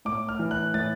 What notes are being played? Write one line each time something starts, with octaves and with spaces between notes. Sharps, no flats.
A2 D6
F6
E3
F#6
A2 A6